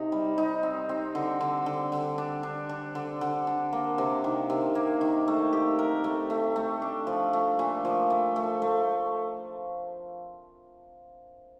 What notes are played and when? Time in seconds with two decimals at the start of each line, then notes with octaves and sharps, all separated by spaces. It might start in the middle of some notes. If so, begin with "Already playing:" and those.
Already playing: C3 D#4
0.12 G3
0.38 D#4
0.63 C4
0.89 C4
1.15 D3
1.41 D3
1.66 D3
1.92 D3
2.18 D4
2.43 D4
2.69 D4
2.95 D3
3.21 D3
3.47 D4
3.73 A#3
3.98 C3
4.24 D#3
4.50 C3
4.75 A#3
5.01 D#3
5.28 A3
5.53 G4
5.79 A#4
6.04 A3
6.30 A3
6.56 A3
6.82 D4
7.07 F3
7.33 A3
7.59 A#2
7.85 F3
8.10 A3
8.36 A3
8.62 A3